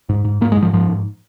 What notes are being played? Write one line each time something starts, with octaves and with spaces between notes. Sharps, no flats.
G#2
G#2
G#2 A#3
G#3
G#2
F3
G#2 F3
G#2